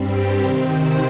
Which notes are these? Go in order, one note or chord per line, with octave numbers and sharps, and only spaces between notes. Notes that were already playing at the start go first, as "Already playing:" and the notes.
Already playing: G2 G3 C4
G4
C3 D#3 C4 A#4
C5